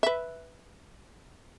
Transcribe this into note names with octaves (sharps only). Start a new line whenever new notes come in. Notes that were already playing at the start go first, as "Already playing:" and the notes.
B4 E5